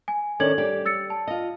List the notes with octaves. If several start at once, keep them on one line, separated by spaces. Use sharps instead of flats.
G#5
D#3 C#4 D4 A4 G#6 F#7
G3 G4 D5
E6 A6 C#7
A5
F4 D#5